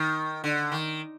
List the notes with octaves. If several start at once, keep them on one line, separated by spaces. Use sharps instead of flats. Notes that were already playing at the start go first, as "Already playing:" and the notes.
Already playing: D#3
D3
D#3